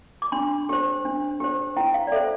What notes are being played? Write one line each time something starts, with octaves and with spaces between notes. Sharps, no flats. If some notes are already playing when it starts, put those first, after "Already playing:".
D6
D4 C6
G4 C5
D4
G4 C5
E4 G5
F5
D5
A4 C5 E5